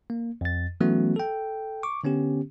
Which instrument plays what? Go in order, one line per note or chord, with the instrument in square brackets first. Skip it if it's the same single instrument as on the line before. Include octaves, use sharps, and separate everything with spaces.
[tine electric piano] A#3
F2 A6
E3 F#3 A3 B3 C#4 F#4
A4 G5
C#6 D6
D3 B3 C#4 G4